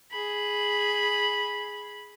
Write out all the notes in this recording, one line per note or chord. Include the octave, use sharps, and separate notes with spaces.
G#4 B5